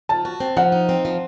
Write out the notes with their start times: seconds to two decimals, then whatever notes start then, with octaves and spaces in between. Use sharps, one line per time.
0.09 F3 A5
0.25 F#4
0.40 C4
0.57 F3 F#5
0.72 D#4
0.89 C4
1.05 F3